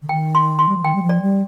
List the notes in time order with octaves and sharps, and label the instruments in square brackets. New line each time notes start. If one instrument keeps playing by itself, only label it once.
[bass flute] D3
[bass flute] D#3 [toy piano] G5
[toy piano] C6
C6
[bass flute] G3
F3
[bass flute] D#3 [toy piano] G5
[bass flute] G3
F3
[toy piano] D5
[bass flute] G3